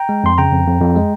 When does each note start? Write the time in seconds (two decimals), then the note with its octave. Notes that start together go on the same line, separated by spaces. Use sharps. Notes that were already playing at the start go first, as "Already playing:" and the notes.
Already playing: G5 A#5
0.09 G#3
0.24 F2 C6
0.38 C#3 G5 A#5
0.53 F2
0.67 F2
0.81 F2
0.96 G#3